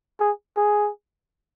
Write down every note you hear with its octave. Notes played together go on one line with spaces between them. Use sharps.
G#4
G#4